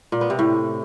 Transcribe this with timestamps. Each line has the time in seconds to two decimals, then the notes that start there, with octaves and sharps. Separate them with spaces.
0.12 A#2
0.21 B3
0.30 C3
0.39 A2